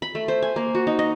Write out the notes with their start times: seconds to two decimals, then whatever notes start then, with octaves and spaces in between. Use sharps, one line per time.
0.02 B5
0.15 A3
0.28 C5
0.43 G#5
0.56 A#3
0.75 F#4
0.87 D#4
0.99 D#5